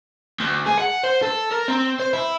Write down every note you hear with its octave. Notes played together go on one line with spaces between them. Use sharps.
D2
G#4
F#5
C5
A4
A#4
C4
C5
E4